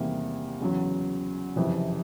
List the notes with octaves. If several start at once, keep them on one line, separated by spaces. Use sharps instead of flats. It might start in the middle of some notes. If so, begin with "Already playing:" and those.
Already playing: E2 C3 D#3 G3 A#3
E2 C#3 F#3
F#1 F2 C3 E3